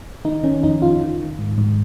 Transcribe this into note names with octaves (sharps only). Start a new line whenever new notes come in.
D#3 D#4
D#3 C#4
F2 D#4
F2 F4
D#3
D#3
G#2
G#2